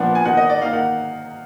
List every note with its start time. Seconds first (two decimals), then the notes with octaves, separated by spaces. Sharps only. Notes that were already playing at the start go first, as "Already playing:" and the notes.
Already playing: A#2 F3 B3 D4 F#5
0.15 G#5
0.25 D#3 A#3 D#4 F#5
0.37 D#5
0.50 D5
0.61 D#3 A#3 D#4 F5
0.73 F#5